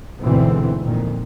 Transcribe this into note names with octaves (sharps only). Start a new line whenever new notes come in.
D2 G#2 B2 E3 C4
F2 A#2 D#3